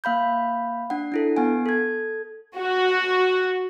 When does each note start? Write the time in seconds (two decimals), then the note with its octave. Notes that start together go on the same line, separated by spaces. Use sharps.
0.04 A#3 F5 B5 G6
0.90 D4 F#5
1.12 D4 E4 A4
1.37 B3 F#5 G#5
1.66 A4 G#6
2.58 F#4